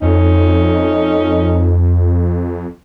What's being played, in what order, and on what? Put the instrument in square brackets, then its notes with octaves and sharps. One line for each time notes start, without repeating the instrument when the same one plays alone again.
[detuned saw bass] F2 [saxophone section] A3 C#4 D#4